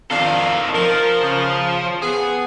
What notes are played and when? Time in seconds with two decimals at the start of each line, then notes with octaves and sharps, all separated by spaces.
0.11 F2 D#3 D4 A4 F5
0.75 F3 A#4
1.21 C#3
2.03 B3 G#4